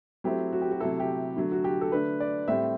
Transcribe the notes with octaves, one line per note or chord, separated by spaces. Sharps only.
F#3 A3 C4 E4 G4
F#4
G4
F#4
C3 F#3 A3 E4 A4
G4
D3 F#3 A3
F#4
G4
A4
D3 A3 D4 B4
D5
A2 G3 C4 E5